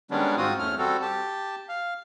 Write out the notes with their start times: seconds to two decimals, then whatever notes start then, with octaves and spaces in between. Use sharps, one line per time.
0.11 D#3 G3 G#3 B3 C#4 D4
0.37 G#2 C4 F4 F#4 D#6
0.59 E2 A3 C#4 F6
0.78 G3 C4 F#4 A4
1.02 G4 A5
1.69 F5